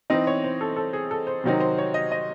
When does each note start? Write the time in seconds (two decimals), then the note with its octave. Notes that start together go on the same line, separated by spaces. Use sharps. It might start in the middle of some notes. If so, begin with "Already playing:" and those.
0.10 E3 C4 D#4 D#5
0.27 C#5
0.44 C5
0.61 A4
0.76 A4
0.93 G#4
1.11 A4
1.27 C5
1.44 C3 D#3 F#3 C4 D#4
1.60 C5
1.78 C#5
1.94 D#5
2.11 D#5